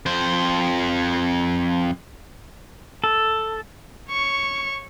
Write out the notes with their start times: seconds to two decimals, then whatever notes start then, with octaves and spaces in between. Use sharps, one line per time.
0.06 F2 C5
3.04 A4
4.11 C#5 C#6